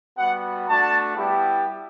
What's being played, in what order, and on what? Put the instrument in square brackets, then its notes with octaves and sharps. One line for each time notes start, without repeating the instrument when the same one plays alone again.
[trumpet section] G3 B3 F#4 F#5
A3 D4 F#4 A5
G3 B3 E4 G4